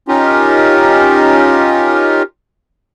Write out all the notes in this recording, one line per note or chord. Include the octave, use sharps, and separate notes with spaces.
C#4 D#4 F4 G4 A#4